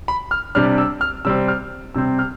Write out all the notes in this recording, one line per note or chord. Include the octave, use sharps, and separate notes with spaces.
B5
F6
C3 G3 D4 F6
E6
F6
C3 G3 C4 E6
F6
C3 G3 C4 E6
F6